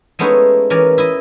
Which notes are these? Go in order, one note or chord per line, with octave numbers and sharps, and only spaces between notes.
G#3 A3 B3 C#4 D#4 E4
E3 C#4 A#4 D5
E4 D#5